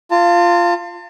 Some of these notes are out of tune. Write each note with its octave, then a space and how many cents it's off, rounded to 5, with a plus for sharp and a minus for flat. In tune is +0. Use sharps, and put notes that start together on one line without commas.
F4 -10 A5 +40